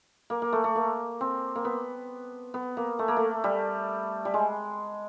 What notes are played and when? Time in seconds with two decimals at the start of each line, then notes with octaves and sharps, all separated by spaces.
0.30 A#3
0.42 A#3
0.52 A3
0.64 A3
0.75 A#3
1.21 C4
1.55 A#3
1.65 B3
2.54 B3
2.77 A#3
2.99 A3
3.08 A#3
3.17 A3
3.44 G3
4.25 G3
4.34 G#3